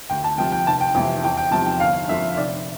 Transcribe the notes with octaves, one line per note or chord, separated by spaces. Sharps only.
D2 G5
A5
C3 F3 G5
G5
F1 A5
G5
F2 C3 E3 G5
E2 G5
G5
C3 F3 A5
G5
G1 F5
F2 D3 F3 E5
F1 D5